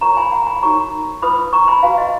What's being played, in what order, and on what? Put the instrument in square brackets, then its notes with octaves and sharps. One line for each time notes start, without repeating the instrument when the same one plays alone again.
[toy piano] F4 A#4 C#5 A#5 C#6
G#5 B5
F#5 A#5
G#5 B5
D#4 F#4 A#4 C#5 A#5 C#6
F4 B4 B5 D#6
A#5 C#6
G#5 B5
F#4 B4 F5 G#5
D#5